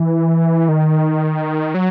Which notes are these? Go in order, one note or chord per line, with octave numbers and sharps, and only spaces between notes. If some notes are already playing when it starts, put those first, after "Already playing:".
Already playing: E3
D#3
F#3